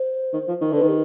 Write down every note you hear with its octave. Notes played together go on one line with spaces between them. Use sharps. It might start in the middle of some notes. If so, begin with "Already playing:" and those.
Already playing: C5
D#3
F3
D#3
D3 B4
D#3
G4